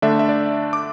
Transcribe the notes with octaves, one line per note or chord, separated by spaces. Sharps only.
D3 A3 D4 E5
E5
D5
D6